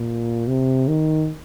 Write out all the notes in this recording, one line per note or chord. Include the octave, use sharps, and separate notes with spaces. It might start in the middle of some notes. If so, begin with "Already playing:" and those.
Already playing: A#2
C3
D#3